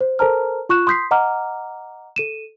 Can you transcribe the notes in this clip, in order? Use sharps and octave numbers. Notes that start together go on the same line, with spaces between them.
C5
A4 A#4 C5 A5 A#5 F6
F4 C#6 F#6 E7
C6 D#6 G6 B6 C7
D#5 F#5 A#5 D6 F6
A4 D#7 E7